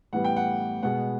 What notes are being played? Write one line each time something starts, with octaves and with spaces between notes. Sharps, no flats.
A2 E3 G3 B3 F#5
G5
F#5
B2 G#3 B3 F#5